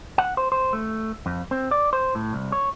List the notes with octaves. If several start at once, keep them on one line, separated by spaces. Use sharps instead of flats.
F#5
C5
C5
A3
F2
C4
D5
C5
A2
C2
C#5